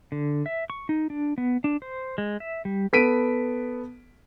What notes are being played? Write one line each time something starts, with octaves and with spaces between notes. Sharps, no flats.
D3
E5
C#6
D#4
D4
B3
D4
C5
G#3
E5
G3
B3 A4 B6 D7 D#7